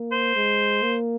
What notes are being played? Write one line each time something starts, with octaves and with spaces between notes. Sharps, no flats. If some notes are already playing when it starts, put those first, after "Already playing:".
Already playing: A#3
C5
G#3
A#3